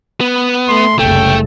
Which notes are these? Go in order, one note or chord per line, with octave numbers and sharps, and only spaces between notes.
B3
A3 C6
F#1 C2 C#3 A3 G5